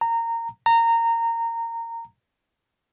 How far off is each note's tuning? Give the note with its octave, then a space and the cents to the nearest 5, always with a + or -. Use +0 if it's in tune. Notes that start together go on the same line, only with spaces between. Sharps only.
A#5 -20
A#5 -20